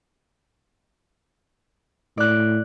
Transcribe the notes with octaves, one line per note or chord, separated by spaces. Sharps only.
A2 D5 F#6